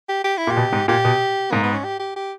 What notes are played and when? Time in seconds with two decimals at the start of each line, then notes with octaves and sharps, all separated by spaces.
0.09 G4
0.24 G4
0.38 E4
0.47 A#2 G4
0.57 B2
0.73 G#2
0.88 A#2 G4
1.05 B2
1.51 G#2 A#3
1.63 B3
1.73 C#4
1.84 G4
2.00 G4
2.16 G4